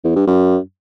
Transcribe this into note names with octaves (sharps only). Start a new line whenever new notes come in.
E2
G2
F#2